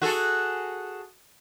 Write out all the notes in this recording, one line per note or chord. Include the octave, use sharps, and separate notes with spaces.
F#4 G#4 A4